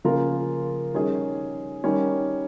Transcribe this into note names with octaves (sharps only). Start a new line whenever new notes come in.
C#3 F3 A#3 F4 A#4
D#3 G3 C#4 G#4
D#3 G3 C#4